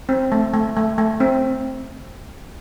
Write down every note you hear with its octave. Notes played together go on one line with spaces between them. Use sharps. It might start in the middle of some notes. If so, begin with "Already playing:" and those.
C4
A3
A3
A3
A3
C4